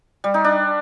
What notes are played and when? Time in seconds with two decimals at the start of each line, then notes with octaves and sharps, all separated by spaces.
0.24 G3
0.34 D#4
0.44 D4